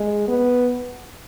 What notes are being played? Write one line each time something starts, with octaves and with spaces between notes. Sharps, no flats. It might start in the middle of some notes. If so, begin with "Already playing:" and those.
Already playing: G#3
B3